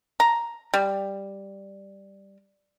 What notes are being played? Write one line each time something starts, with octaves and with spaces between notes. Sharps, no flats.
A#5
G3